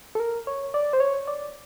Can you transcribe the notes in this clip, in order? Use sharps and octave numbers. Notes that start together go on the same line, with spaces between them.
A4
A#4
C#5
D5
C5
C#5
D5